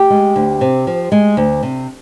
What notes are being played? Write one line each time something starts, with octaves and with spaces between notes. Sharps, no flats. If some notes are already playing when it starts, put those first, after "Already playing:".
Already playing: G4
G#3
D2
C3
F3
G#3
D2
C3